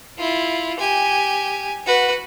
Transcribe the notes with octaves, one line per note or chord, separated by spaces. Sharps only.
E4 F4
G4 G#5
F#4 B4